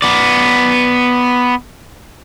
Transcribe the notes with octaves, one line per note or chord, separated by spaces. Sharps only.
B3 D5